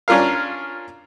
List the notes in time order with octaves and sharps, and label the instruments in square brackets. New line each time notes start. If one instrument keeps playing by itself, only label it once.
[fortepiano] C#4 D4 F4 A#4 F5